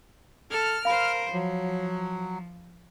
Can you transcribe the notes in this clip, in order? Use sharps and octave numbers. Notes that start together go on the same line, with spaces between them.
A4 F6
A#4 C5 F5 B5
F3 F#3